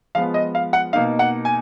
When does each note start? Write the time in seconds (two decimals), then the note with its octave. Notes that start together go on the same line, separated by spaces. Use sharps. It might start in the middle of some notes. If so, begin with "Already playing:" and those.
0.15 F3 G#3 B3 F4 F5
0.34 D#5
0.55 F5
0.73 F#5
0.93 B2 A#3 D#4 F5
1.19 F#5
1.45 G#5